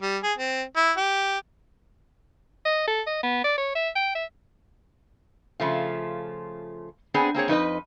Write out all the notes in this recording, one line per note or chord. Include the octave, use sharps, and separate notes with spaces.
G3
G#4
C4
E4
G4
D#5
A4
D#5
B3
D5
C#5
E5
G5
E5
C#3 F3 A3 F4
B3 C4 D4 G#4 G#5
A#3 C4 G#4 C#5
F2 D#4 B4 D#5